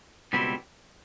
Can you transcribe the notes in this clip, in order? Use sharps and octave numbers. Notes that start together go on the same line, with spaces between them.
C#2 B2 G3 C4 E4